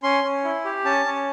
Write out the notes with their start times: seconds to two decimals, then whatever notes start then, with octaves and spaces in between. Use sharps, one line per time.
0.03 C#4 C6
0.24 C#4
0.44 E4
0.65 G4
0.85 C#4 A5
1.05 C#4